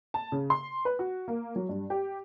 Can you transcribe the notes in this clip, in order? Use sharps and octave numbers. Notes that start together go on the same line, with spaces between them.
A5
C#3
C6
B4
F#4
A#3
F#3
G2
G4